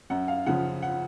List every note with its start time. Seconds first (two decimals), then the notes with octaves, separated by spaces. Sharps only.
0.10 F#2 F#5
0.28 F5
0.46 C#3 F3 F#5
0.82 F#5